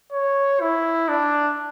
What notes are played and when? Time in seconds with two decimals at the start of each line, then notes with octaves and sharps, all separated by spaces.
0.13 C#5
0.61 E4
1.09 D4